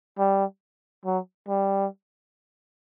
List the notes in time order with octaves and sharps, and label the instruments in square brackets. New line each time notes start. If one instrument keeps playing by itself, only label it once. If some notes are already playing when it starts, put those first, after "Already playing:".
[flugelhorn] G3
F#3
G3